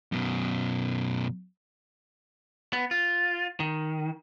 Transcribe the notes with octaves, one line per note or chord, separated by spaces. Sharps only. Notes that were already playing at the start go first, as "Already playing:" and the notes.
F#2 B2
B3
F4
D#3